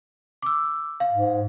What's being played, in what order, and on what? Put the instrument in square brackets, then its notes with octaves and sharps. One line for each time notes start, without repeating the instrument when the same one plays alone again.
[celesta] D6 E6
F5
[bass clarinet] G#2